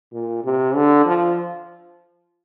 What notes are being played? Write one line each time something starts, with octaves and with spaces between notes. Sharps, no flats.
A#2
C3
D3
F3